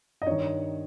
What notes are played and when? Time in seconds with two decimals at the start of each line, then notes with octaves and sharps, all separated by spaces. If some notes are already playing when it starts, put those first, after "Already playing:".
0.22 D#5
0.26 G2 D#3 C#5